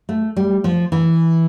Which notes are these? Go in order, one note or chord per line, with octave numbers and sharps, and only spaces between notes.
A3
G3
F3
E3